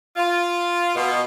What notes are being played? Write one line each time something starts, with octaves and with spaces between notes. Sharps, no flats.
F4
B2